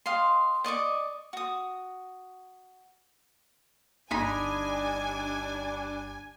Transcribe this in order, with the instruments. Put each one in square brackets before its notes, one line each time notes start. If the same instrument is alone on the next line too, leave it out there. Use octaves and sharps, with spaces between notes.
[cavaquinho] G4 D#5 F5 C6
D5 D#5 C#6 D6
F#4 D#6
[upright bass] G1 D2 [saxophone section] G3 D4 [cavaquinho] D#4 B5 [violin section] G#5